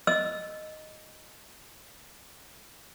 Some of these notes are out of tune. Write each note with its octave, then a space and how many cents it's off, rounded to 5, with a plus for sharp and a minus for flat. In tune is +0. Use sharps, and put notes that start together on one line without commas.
D#5 +0 E6 +0